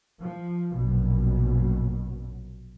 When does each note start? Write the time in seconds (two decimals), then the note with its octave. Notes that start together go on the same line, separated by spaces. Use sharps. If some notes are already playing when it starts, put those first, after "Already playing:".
0.19 F3
0.74 A#1 F#2 B2